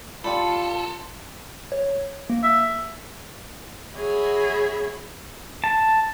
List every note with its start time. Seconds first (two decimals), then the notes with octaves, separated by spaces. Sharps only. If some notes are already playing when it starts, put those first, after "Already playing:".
0.24 F4 G4 A4 D5 A5 B5 C6 C#7
1.72 C#5
2.30 A#3
2.43 E5
3.96 F#4 G#4 C#5 E5 B5
5.64 A5